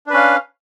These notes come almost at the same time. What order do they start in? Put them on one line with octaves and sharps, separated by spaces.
D4 B4 C#4 F5